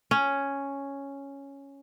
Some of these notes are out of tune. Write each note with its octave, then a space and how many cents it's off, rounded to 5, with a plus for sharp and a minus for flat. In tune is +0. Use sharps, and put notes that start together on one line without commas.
C#4 +0